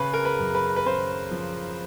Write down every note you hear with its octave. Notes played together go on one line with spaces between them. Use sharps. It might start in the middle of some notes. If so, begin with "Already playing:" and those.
Already playing: C#3 B4
A#4
B4
F#2
B4
B4
C#3 C5
F3